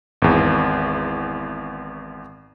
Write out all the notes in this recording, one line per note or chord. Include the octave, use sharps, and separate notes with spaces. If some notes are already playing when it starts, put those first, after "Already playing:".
G#1 E2